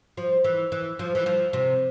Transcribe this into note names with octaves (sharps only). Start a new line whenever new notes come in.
F3
E3
E3
F3
E3
F3
C3